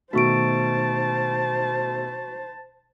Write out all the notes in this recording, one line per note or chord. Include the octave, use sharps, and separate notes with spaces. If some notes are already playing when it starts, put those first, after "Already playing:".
B2 D#3 A3 F#4 C5 A5 C#6 D7